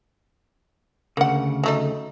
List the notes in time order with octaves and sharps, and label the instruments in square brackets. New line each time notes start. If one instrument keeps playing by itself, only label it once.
[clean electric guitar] D2 G#2 C#3 [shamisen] A#3 F#5
[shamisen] F#3 A3 D#4